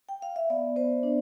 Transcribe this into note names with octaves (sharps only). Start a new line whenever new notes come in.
G5
F5
E5
B3 D5
B3 C5
D4